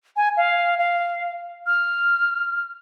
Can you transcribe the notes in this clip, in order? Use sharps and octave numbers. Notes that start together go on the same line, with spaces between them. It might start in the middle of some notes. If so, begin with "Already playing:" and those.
G#5
F5
F5
F6